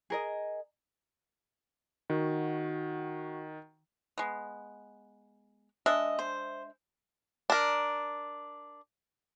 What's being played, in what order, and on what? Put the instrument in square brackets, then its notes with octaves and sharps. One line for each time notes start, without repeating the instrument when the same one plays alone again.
[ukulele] G#4 A#4 D#5
[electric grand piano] D#3 [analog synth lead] F#4
[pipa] G#3 B3
[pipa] G#3 D4 E5 [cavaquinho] D#5
[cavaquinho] C5
[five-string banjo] D4 A#4